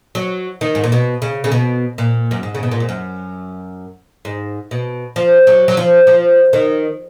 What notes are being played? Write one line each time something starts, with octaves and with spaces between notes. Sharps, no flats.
F#3
D#3
G#2
A#2
B2
C#3
C#3
B2
A#2
F#2
G#2
C#3
B2
A#2
G#2
F#2
G#2
B2
F3
F#3
F#3
F3
F3
D#3